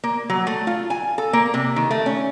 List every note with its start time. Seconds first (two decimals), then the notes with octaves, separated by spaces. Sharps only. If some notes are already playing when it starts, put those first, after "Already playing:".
0.04 A#3
0.30 F#3
0.47 A3
0.67 F4
0.90 G#5
1.18 A4
1.33 A#3
1.54 C3
1.76 D#3
1.91 A3
2.06 C#4